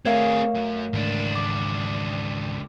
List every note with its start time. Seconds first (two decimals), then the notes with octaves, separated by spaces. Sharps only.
0.05 A3 C4 G#4 A#4 C#5 E5 F5
0.55 F#2
0.93 C#2 G#2 D#3 E3 D4
1.35 D6